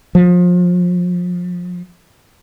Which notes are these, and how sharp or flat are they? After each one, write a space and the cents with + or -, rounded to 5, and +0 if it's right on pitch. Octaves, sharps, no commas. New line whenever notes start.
F3 +30